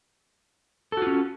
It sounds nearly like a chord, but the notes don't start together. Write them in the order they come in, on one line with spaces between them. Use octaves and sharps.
A4 F#4 F4 C#4